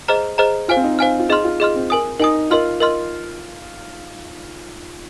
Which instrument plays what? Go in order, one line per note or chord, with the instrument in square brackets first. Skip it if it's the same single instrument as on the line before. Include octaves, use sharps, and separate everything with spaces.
[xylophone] G#4 C5 D#5 A#5 F6
G#4 C5 D#5 A#5 F6
[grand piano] F4 [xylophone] C5 F5 G#5 F6
[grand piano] C4
D#4
[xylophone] C5 F5 G#5 F6
[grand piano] F4
[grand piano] D#4 [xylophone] G#4 D#5 C6 F6
[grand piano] F4
[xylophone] G#4 D#5 C6 F6
[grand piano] C4
[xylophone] A#4 G#5 D#6
[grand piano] D#4 [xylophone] A#4 G#5 D#6
[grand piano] F4 [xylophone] A#4 D#5 C6 F6
[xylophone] A#4 D#5 C6 F6